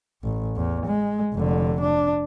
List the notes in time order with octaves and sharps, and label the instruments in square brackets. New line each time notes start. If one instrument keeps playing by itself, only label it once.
[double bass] A1
E2
G#3
F1 D3
D4